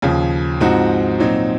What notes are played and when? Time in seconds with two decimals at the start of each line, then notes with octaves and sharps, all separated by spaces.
0.02 D#2 C#3 F3
0.61 G#2 F3 C4 D#4 F#4
1.20 A#2 F#3 C4 D#4